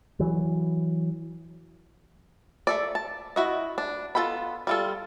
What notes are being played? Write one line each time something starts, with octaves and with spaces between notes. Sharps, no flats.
E3 F#3
A3 A4 D5
A5
E4 F#4 D#5
D4
B3 F4 A4 G5 B5
G3 F4 A4